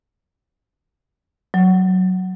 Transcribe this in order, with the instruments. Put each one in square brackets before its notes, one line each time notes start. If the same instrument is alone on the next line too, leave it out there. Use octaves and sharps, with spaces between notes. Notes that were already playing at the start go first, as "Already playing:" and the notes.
[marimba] F#3